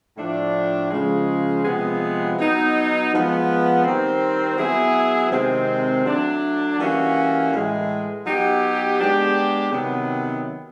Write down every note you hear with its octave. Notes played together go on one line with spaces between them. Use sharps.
A2 F3 A3 D4
C#3 F3 G#3
C3 F3 G#3 B3
F#3 B3 D#4
F3 G#3 B3
D#3 G3 C4
F#3 B3 E4 G#4
C3 D#3 G#3 C4
F#3 A3 D4
E3 G3 A#3 C#4 F#4
A2 E3 G#3
F#3 B3 D#4 G4
G#3 B3 D4 G4
C3 D#3 F#3 B3